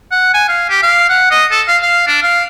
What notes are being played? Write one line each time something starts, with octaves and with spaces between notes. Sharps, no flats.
F#5
G#5
F5
G4
F5
F#5
D#5
A4
F5
F5
D4
F5